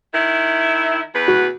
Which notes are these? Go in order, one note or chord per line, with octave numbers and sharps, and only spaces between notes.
D#3 E4
E2 B4
F#4